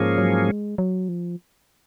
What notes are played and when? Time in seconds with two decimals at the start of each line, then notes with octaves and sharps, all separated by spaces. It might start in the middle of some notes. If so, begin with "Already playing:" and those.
Already playing: G#2 F3 A#3 C#4 G#4
0.18 F#3
0.48 G#3
0.78 F#3
1.09 F3